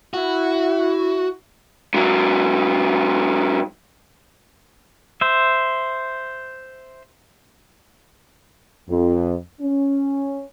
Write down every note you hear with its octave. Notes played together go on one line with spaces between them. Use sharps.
E4 F#4
G#2 F#3
C5 E5
F2
C#4